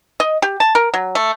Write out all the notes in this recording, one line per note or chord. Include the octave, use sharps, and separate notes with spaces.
D#5
G4
A5
A#4
F#3
A3